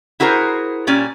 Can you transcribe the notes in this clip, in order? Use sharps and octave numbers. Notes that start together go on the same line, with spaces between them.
E4 F#4 G#4 A#4 C5
A#2 G3 C#4 G#5